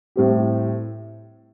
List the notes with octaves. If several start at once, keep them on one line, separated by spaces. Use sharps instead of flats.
A2 G3 C4 G4